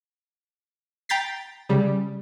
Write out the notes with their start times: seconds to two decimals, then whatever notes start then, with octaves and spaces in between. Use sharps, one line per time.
1.09 G5 A#5 G6 A6 B6 C7
1.69 C#3 G3